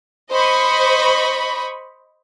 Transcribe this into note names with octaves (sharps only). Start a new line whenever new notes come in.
C5 D#5 B5 C#6